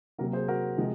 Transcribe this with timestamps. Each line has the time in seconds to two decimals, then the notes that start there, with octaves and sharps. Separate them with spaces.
0.18 C3 F#3 A#3 F#4 A#4
0.33 G#4 C5
0.48 F#4 A#4
0.78 C3 F3 G#3